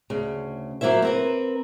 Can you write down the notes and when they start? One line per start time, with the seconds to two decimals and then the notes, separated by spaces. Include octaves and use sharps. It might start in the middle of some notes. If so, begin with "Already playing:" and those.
0.10 D2 C#3
0.81 F#3 A#3 E4 C5 E5
1.02 C4 A#4 B4